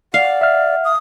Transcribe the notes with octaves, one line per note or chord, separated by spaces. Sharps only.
D5 F5 F#5
E5 F6
D#6